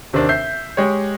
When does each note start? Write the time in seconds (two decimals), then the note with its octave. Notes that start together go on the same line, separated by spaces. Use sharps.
0.13 D#2 C3 D#3 C4 D4
0.29 E5 G6 C7
0.77 G#3 G4 C#5